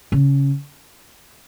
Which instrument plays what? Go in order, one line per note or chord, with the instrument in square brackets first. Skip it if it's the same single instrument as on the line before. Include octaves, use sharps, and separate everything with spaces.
[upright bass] C#3